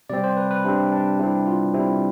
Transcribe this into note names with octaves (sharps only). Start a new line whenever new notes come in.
C3 G3 C4 D5
C5
B4
B4
C3 G3 C4 D4
D4
C3 G3 C4 E4
F4
C3 G3 C4 E4